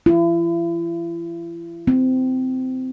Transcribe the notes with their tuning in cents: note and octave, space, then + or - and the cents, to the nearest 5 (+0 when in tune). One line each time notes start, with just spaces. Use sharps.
E4 +40
C4 -20